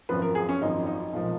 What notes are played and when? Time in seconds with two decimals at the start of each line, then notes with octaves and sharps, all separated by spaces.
0.09 G#1 F#2 F3 B4
0.22 A#4
0.35 G#4
0.49 C#4
0.61 G#1 F#2 F3 D#4
0.87 D#4
1.13 B1 A#2 F3 G#3